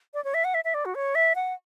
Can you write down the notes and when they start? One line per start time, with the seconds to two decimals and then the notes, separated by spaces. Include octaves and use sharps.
0.14 D5
0.24 C#5
0.34 E5
0.44 F#5
0.54 E5
0.64 E5
0.74 D5
0.85 F#4
0.95 C#5
1.15 E5
1.35 F#5